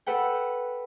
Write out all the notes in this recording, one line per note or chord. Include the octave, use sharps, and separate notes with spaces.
A4 B4 F#5 G5